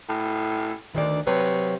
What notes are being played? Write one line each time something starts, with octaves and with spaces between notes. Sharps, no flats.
A2
D2 D#3 D4 D5
C3 F#3 B4 C#5